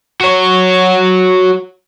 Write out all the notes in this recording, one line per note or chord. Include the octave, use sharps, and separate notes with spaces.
F#4 C#5